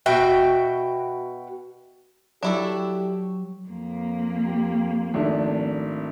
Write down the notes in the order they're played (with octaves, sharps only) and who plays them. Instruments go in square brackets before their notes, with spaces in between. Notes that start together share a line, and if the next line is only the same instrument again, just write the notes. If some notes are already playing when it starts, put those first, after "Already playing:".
[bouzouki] B2 F#4 E5 G5
[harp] F#3 [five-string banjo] D4 E4 A4 [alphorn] G4
[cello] F2 A#3
[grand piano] G4
G#1 A3 D4